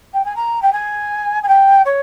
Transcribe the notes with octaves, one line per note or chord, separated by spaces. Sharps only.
G5
G#5
A#5
G5
G#5
G#5
G5
C#5